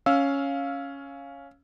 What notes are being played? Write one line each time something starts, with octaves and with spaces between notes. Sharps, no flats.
C#4 F5 E6